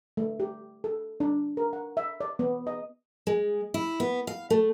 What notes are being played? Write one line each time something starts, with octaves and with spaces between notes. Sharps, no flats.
A3
G4
A4
D4
A#4
F#5
E5
D5
B3
D#5
G#3
E4
B3
F5
A3